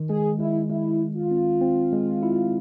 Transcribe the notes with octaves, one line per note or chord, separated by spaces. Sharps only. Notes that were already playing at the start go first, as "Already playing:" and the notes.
Already playing: D#3
G#3 G#4
G#3 E4
G#3 E4
G#3
F4
C4
C4
G#3
E4